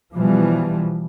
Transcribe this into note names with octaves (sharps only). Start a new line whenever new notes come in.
B2 E3 F3 G3